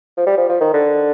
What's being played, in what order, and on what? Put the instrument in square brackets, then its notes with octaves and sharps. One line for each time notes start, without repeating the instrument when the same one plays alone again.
[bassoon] F3
G3
F3
F3
D#3
D3